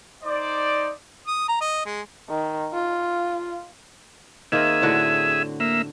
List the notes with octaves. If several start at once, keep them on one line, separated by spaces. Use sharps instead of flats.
D#4 C5 D5
D#6
A#5
D#5
G#3
D#3
F4
D#3 A#3 C4 G#4 E5
A2 D3 F#4
A#3 E5